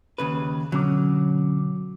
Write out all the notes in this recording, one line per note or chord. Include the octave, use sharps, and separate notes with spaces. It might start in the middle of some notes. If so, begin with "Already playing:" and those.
D#2 C#3 B4
B2 D3 F#3 C#4 D6